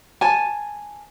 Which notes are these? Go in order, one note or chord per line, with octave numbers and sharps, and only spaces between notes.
G#5 A5